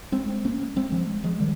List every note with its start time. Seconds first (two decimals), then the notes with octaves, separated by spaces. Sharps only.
0.12 G#3 C4
0.45 A#3 C#4
0.76 G#3 C4
0.92 F3 G#3
1.24 F3 G#3
1.40 D#3 G3